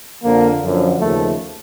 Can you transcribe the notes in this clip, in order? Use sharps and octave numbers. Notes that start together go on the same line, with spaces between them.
F2 D3 F3 A#3
F#2 D3 F3
D#2 C#3 F3 A3